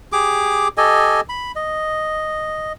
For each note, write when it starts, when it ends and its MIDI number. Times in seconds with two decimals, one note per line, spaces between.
0.12 0.68 67
0.12 0.68 68
0.12 0.68 86
0.77 1.21 67
0.77 1.21 69
0.77 1.21 75
0.77 1.21 80
1.29 1.52 83
1.56 2.73 75